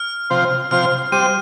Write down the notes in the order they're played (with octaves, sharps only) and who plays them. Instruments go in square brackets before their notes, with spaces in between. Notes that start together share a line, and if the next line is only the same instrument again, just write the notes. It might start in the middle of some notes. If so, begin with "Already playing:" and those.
Already playing: [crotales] F6
[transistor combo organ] C3 F3 C4 F4 C5
[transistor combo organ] C3 F3 C4 F4 C5 [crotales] F6
[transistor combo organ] G3 C4 G4 C5 [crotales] D#7